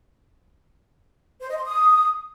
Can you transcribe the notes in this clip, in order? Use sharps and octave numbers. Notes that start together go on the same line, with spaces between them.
C5
D#5
C6
D#6